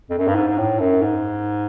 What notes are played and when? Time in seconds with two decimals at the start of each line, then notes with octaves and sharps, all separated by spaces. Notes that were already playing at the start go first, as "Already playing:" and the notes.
0.10 F2
0.18 F#2
0.28 G2
0.35 G#2
0.48 G#2
0.58 A2
0.80 F#2
1.02 G#2